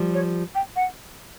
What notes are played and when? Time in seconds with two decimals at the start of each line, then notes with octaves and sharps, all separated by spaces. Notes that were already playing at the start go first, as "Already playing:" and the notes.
Already playing: F3 G3
0.14 C#5
0.55 G5
0.76 F#5